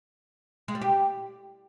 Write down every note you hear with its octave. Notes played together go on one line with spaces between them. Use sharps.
G#3
G3
G4